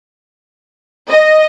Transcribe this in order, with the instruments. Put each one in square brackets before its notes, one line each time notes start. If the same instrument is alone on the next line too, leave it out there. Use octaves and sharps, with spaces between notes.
[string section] D#5